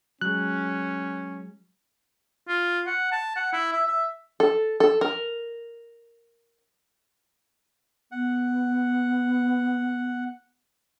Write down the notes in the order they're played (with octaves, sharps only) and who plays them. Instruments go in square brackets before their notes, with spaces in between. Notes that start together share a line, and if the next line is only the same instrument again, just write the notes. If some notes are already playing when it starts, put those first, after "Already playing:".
[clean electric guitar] F#3 G#3 [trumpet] C#4 [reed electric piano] F#6
[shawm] F4
F#5
A5
F#5
E4
E5
E5
[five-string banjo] A4
A4
A#4
[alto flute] B3 [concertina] F#5